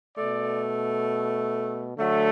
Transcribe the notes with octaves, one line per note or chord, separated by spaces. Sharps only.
B2 A3 D5
D3 F#3 A3